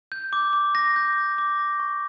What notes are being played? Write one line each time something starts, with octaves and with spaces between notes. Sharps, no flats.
G6
D6
D6
A#6
G6
D6
D6
A#6
C#6